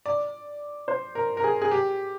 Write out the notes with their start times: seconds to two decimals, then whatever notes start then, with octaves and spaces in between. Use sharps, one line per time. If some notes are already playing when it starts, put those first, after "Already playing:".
0.06 D5
0.88 C5
1.15 A#4
1.37 A#4
1.44 G#4
1.62 G#4
1.71 G4